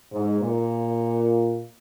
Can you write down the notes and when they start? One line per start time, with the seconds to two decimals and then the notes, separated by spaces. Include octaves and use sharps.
0.11 G#2
0.39 A#2